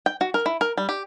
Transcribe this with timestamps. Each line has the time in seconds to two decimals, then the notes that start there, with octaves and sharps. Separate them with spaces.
0.06 G5
0.21 F#4
0.34 A#4
0.46 E4
0.61 A#4
0.77 G3
0.89 G4